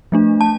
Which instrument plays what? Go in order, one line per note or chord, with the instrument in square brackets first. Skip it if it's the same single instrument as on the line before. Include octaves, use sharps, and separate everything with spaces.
[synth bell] F3 A3 D4
A5